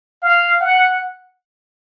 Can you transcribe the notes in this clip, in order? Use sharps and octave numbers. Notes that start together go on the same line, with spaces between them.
F5
F#5